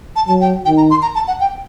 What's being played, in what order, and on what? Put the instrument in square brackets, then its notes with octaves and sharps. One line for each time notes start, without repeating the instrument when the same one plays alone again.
[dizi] A5
[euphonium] F#3 [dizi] A5
[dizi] G5
[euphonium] D#3 [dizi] G5
[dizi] A#5
C6
A#5
A5
F#5
G5